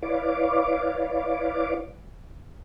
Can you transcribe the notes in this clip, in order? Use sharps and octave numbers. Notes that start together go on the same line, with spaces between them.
E4 B4 C#5 D5 F5 D6